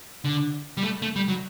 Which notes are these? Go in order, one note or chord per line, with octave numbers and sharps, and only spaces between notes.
D3
G3
A3
A3
G3
F#3